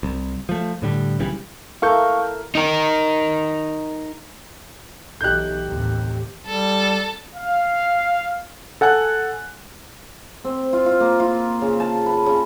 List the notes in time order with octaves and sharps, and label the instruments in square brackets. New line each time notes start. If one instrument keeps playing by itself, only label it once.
[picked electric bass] C2
F3 A3
A2 D3 G3
B1 C#3 E3 G3
[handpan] E4 A4 A#4 [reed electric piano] F5 C#6 G6
[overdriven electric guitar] D#4 A#4
[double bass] B1 E3 [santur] A3 D#4 G4 [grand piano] F#6 G6
[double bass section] D#2 A2 [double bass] C3 E3
[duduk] G3 [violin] A4
[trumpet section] F5
[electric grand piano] A4 F#5 G#5 F#6
[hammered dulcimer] C4
F4
F4
A#3
F4
C#3
A5
B4
C#3